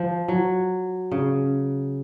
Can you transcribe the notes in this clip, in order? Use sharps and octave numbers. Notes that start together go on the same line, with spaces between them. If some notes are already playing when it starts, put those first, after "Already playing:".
Already playing: F3
F#3
C#3